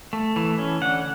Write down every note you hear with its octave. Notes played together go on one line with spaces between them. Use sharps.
A3
E3
C#4
D3 F#5